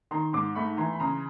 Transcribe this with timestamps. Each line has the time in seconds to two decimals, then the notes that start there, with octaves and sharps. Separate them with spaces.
0.11 D#3 A#5 C6
0.33 G#2 C6 D6
0.55 A3 B5 C#6
0.77 E3 A#5 C6
0.93 B5
1.00 C#3 A#5 C6